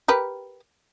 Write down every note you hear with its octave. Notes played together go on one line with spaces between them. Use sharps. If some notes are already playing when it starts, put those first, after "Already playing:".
G4 A#4 B4